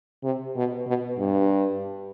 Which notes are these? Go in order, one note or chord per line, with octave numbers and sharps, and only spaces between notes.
C3
B2
B2
G2